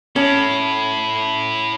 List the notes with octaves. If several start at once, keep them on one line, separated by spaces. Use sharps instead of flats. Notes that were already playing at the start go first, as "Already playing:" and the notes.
C#4 E4 A4